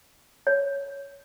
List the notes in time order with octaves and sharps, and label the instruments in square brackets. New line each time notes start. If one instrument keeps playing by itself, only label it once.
[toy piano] C#5